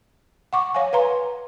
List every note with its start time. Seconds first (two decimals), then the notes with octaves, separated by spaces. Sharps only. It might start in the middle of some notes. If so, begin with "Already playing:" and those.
0.53 F#5 C#6 D6
0.75 C#5 F5 F#5 G#5
0.93 B4 F5 A#5 C6